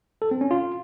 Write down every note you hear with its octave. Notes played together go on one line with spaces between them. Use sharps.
A4
C4
C#4
F4